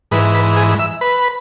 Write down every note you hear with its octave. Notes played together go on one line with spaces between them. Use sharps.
G#2 E3 B4
B4
G#4
E5
B4